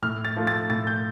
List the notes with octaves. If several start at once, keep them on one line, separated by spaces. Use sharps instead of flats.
A2 F6
A6
F3 A3
A6
A2 A6
G6